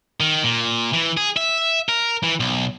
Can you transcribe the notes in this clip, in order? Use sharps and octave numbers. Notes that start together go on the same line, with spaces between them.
D#3
A#2
E3
G#4
E5
A#4
E3
B1